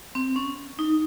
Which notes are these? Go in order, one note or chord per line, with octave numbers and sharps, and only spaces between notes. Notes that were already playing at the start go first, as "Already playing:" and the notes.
C4
C#4
D#4